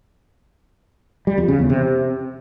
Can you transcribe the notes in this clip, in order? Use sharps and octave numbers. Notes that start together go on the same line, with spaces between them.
G3
F2
C#3
E2
C3